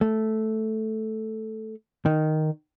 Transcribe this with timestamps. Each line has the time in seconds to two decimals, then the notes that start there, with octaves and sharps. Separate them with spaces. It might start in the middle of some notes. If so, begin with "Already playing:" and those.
0.01 A3
2.06 D#3